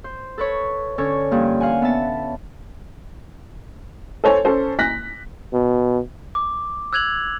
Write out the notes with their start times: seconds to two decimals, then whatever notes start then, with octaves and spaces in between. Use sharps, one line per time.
0.04 C5
0.38 A4 B4 C#5
0.98 D3 C#4 A4 C#5
1.31 G2 F3 A#3
1.60 F5 F#5 G#5
1.82 B3 E5 A5
4.24 A4 C5 C#5 G#5
4.45 C#4 A4 C5
4.79 F#6 A#6 B6
5.53 B2
6.35 D6
6.93 E6 F#6 G#6 F7 F#7